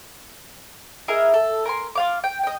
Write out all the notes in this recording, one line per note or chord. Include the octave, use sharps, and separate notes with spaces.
E4 G#4 A#4 D#5
A4
A#4 G#5 C6
F4 F5 D6
G5
D#5 G5